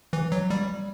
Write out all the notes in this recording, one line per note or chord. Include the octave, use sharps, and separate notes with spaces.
E3
F#3
G3